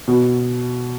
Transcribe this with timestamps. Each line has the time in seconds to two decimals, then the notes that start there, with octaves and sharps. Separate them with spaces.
0.08 B2